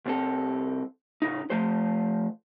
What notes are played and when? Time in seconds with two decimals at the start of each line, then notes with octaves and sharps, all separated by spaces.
0.06 C2 C4 A4
1.22 A2 C#3 D#4
1.50 F3 A3 C5